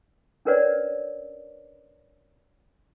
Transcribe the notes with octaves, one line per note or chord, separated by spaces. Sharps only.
C#4 D4 A#4 B4 C#5 D5